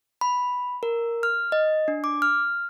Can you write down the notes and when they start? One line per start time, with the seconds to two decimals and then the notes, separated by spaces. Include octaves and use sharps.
0.21 B5
0.83 A#4
1.23 F6
1.52 D#5
1.88 D4
2.04 D6
2.22 F6